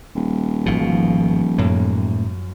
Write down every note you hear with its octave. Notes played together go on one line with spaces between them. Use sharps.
D#1
G#1 B2 F3
F#2 A2 A#3